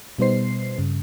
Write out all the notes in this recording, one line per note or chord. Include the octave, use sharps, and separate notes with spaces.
B2 G3 B3 D#4 C5 C7
G2 C#3